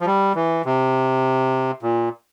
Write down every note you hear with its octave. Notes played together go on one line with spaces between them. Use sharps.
F3
G3
E3
C3
A#2